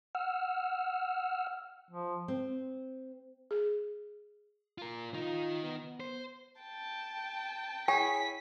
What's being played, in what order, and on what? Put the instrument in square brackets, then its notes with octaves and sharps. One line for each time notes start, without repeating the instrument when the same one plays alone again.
[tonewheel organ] F#5 E6 F6
[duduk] F3
[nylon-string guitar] C4
[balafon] G#4
[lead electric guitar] F4 A#4
[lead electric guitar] D#3 D#4 [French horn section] F4
[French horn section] B3
[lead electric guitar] C5
[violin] G5 A5
[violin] E4 B6 [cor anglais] G#4 [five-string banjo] C#5 [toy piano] G5